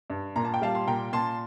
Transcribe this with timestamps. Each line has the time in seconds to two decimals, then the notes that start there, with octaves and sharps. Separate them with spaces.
0.10 G2
0.36 A#2 A#5
0.45 A5
0.54 G5
0.62 G3 F5 A5
0.75 C6
0.87 A#2 G5 A#5
1.13 A#2 A5 C6